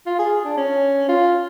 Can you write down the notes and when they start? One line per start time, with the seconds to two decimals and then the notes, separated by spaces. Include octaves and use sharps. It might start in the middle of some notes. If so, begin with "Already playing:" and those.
0.06 F4
0.19 G#4
0.45 D4
0.57 C#4
1.09 F4